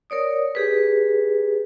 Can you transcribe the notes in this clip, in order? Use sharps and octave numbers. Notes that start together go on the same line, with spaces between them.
A#4 C#5 D5 D#6
G4 G#4 B4